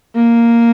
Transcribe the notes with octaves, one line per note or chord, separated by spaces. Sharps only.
A#3